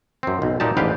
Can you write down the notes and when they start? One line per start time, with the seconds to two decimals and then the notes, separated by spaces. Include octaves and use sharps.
0.23 F#2 C4
0.42 B1
0.60 A#2 D#4 G4 A5
0.77 A1 G#2 D3 G4 B4 F5